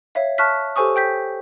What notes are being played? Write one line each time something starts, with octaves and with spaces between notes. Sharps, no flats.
C#5 E5 F5
A5 C#6 F6 F#6 B6
G4 A4 C5 G#5 C#6 D#6
G5 G6 B6